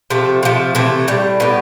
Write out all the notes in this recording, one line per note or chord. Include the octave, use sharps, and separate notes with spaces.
C3 F3 A3
C3 F3 A3
C3 E3 A3
A2 G3
A2 G3 B3